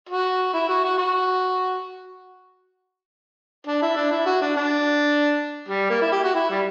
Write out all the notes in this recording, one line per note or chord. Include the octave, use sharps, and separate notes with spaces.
F#4
E4
F#4
F#4
F#4
D4
E4
D4
E4
F#4
D4
D4
G3
A#3
E4
G4
F#4
E4
G3